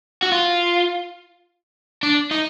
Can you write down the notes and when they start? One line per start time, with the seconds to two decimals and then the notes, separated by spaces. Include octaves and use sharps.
0.23 F#4
0.32 F4
2.03 D4
2.31 D#4